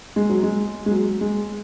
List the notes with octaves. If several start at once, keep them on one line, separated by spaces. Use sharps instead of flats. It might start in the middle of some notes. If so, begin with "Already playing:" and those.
G#3
F#3
G#3
G#3
F#3
G#3